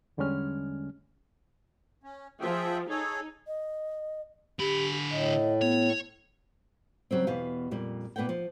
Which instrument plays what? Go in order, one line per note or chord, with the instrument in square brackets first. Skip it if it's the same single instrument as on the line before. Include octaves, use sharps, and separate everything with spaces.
[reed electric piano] E2 D3 G3 G#3 C#4 F6
[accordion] C#4
[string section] F3 [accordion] G#4 E5 G5
[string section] D#4 [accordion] G#4 A4 C#5
[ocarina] D#5
[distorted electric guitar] D3 B5 [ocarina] G4
[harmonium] A2 [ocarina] D#5
[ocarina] B3 [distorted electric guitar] C#5
[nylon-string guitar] C#3 F#3 G3 C4
E2 B2 G4 F5 G#5
F2 A#2 G3
A#2 B3 B4 F#5 G5
F3